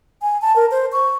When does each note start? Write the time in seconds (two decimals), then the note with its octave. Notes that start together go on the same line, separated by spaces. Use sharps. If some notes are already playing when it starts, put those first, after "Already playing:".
0.22 G#5
0.41 A5
0.56 A#4
0.71 C5
0.92 C#6